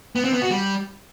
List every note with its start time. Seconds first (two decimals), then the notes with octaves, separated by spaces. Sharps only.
0.15 B3
0.24 C4
0.33 B3
0.42 F#4
0.51 G3